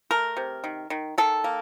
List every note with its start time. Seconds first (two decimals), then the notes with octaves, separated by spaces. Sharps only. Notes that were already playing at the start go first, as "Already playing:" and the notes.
0.11 A3 A#4
0.37 C3
0.64 D#3
0.90 D#3
1.18 D#3 A4
1.44 A#3